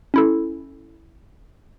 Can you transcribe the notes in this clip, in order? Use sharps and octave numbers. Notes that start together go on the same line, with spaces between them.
C#4 E4 A4